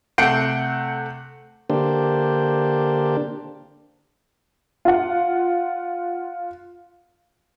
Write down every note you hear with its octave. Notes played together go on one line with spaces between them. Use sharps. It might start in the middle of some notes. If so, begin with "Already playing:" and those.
C3 A3 F#5 G6 C7 D7
D3 A#3 D4 G4 C5
F4 F#5